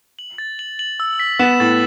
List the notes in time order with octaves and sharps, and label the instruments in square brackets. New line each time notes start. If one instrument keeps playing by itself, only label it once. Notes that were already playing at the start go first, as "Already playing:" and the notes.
[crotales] F#7
A6
F#7
F#7
E6
B6
[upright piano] B3 [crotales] E7
[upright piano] A2 [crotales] A6